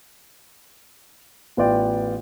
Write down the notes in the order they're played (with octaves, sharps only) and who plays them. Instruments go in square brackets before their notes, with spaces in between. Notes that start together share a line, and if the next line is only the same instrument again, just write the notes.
[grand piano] A1 B3 F4 D5 G5